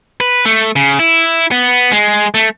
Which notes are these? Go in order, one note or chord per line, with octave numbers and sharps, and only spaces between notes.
B4
A3
C#3
E4
B3
G#3
A3